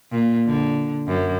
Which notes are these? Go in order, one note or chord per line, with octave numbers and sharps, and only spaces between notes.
A#2
D3
F#2